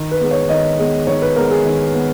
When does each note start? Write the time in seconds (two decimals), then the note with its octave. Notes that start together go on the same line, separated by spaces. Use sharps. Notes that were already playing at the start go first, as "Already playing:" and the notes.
Already playing: D#3
0.11 B4
0.21 G#3 B3
0.31 C#5
0.49 D#3 D#5
0.79 G#3 B3
1.07 D#3 C#5
1.22 B4
1.36 G#3 B3 A#4
1.51 G#4
1.65 D#3
1.95 B3